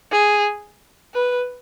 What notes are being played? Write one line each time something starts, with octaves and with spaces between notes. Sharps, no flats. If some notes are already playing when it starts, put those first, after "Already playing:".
G#4
B4